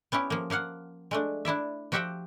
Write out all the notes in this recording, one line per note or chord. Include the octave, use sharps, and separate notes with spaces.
B3 C#4 E4 G4
F3 A#3
F3 A#3 F5 F#5
G#3 A3 D4
D4 E4 D5 E5
F3 F#4 G4 E5 F#5 G5